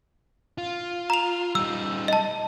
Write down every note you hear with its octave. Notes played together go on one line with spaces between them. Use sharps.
F4
A#5 F7
G3 D#4 E6
D#5 A5